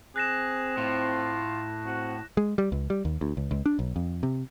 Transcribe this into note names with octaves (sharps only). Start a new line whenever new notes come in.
C4 G#4 F#6 A#6 E7
A2 F4
C4 F#4
G#3
G3
C#2
G3
D#2
D2
C#2
C#2
D4
B1
F2
C3